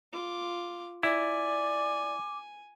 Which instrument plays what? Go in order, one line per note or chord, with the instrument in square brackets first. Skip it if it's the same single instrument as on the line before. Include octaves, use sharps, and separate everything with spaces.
[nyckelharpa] F4 D6
[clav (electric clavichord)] E4 [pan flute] D5 [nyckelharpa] G#5 [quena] D6